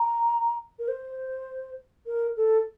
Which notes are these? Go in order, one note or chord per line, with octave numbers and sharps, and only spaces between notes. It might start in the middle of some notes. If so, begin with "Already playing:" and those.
Already playing: A#5
A#4
C5
A#4
A4